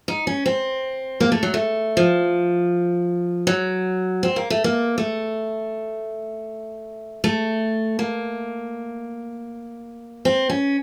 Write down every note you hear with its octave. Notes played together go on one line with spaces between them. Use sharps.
D#4
C#4
C4
A#3
A3
F#3
A3
F3
F#3
C4
A#3
A3
A#3
A3
A3
A#3
C4
C#4